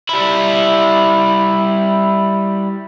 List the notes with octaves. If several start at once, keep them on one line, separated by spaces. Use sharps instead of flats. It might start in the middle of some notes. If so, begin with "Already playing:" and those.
G3 E4